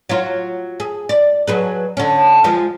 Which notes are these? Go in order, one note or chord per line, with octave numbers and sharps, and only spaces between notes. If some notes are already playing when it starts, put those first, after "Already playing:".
F#3 F4
G#4
D5
F#3 G#4 B4
D3 C#4
F3 G#3